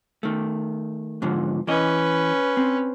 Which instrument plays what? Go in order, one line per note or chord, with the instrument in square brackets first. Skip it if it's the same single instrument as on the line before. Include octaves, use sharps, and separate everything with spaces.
[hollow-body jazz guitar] D#3 A3
G#2 D3 F3
[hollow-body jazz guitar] E3 D#5 [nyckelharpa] C#4 B4
[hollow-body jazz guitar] C4